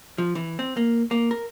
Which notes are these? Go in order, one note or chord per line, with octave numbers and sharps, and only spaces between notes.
F3
E3
C4
A#3
A#3
A#4